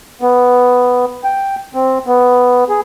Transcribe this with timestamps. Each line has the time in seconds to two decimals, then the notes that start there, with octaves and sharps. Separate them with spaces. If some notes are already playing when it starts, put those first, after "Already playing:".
0.21 B3
1.24 G5
1.74 C4
2.06 B3
2.69 G#4